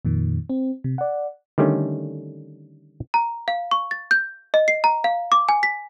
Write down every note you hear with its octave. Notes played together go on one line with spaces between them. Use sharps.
F2 A#2 D#3
C4
C3
D5 F#5
D3 D#3 G3 A3 C#4
A#5
F5
C#6
A6
G6
D#5
C7
A#5
F5
D6
G#5
B6